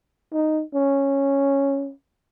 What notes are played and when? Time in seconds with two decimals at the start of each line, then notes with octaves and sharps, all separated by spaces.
0.33 D#4
0.74 C#4